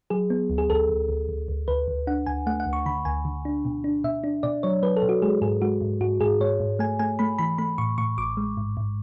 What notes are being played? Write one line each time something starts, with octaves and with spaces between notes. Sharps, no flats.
F#3 G#4
B3
D2
G#4
D2 A4
D2
D2
D2
D2
D2 B4
D2
D4 F#5
D2 G#5
A3 F#5
F#5
D2
C#6
D3 B5
D2 G#5
D3
D4
B2
D4
B2 E5
D4
B2 D5
F#3 C#5
F#3 B4
A4
B2
F#4
G#3 G#4
G#2 G#4
G#3 F#4
G#2
G#2 F#4
G#2 G#4
G#2 C#5
G#2
A3 G#5
A3 G#5
A3 B5
E3 B5
A3 B5
A2 C#6
A2 C#6
A1 D6
G#3
G#2
G#2